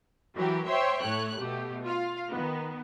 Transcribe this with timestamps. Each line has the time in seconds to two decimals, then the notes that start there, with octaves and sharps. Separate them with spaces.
0.34 E3 F#3 G4 A#4
0.66 C5 C#5 E5 G5 C6
1.03 A2 A3 C#5 F#6
1.38 B2 A3 G4
1.83 F4 F5
2.31 D#3 B3